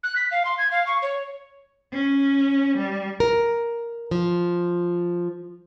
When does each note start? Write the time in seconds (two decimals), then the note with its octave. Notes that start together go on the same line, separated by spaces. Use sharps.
0.03 F#6
0.16 B6
0.31 F5
0.45 C6
0.58 G#6
0.71 F5
0.87 C#6
1.02 C#5
1.93 C#4
2.78 G3
3.20 A#4
4.11 F3